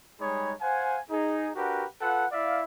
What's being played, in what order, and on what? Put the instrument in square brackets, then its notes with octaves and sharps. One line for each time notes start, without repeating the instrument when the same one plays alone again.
[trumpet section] G3 G#3 D#4 G#4 C#5 B5
C5 F5 F#5 G#5
D#4 G#4
D4 F#4 G4 A#4 B4 F#5
F4 A4 B4 F#5
E4 D5 E5 F5